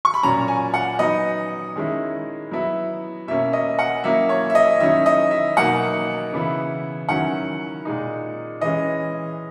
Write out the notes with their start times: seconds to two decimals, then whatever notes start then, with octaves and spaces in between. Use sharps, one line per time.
0.05 C#6
0.14 B5
0.23 A#2 F#3 C#4 A#5
0.48 G#5
0.74 F#5
0.99 F#3 B3 D#4 D#5
1.75 D#3 G#3 C#4 E4
2.51 F#3 B3 E4
3.28 B2 A#3 C#4 E5
3.53 D#5
3.79 F#5
4.04 F#3 A#3 C#4 E4 E5
4.29 C#5
4.50 E5
4.55 D#5
4.80 D#3 F#3 C#4 E4 E5
5.06 D#5
5.31 E5
5.57 B2 F#3 A#3 D#4 F#5
6.32 C#3 E3 B3 E4
7.09 D#3 F#3 C#4 E4 F#5
7.85 A#2 G#3 D#4
8.61 E3 G#3 C#4 D#5